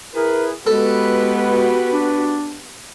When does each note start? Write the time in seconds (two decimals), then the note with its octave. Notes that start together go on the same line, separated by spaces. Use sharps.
0.15 E4 G#4 A#4 B4
0.67 G#3 B3 F#4 G4 A4 B4
1.93 D4